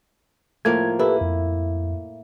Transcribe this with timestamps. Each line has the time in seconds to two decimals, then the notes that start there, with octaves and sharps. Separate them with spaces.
0.65 A2 F3 A#3 G#6
0.99 E4 G4 A4 B4
1.21 F2